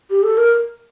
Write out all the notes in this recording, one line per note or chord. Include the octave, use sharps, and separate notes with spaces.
G4
A4
A#4